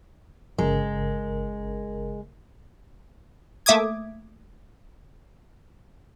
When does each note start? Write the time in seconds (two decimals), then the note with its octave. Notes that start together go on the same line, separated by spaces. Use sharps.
0.58 G1 C#3 G#3 A#4
3.66 A3 A#3 E5 D6 D#6 G#6